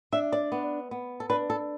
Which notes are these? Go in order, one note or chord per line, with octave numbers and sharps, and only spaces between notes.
D4 E5
D5
B3
B3
A4
D4 B4
A4